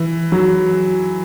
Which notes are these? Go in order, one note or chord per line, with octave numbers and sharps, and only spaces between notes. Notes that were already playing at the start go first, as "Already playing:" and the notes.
Already playing: E3
F#3